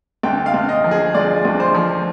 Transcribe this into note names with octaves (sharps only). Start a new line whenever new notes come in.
D2 G5
F5
D2
D#5
F3
G#4
D2 D5
D2
C5
F3